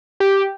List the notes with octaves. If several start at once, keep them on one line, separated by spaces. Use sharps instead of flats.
G4